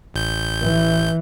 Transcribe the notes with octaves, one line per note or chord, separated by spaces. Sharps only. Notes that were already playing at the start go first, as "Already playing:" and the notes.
A1 G6
E3